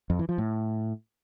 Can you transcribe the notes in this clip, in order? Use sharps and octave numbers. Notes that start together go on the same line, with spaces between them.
F2
E3
F3
A2